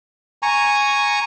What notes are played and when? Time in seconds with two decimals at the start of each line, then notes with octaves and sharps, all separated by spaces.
0.43 G#5 A#5 C#6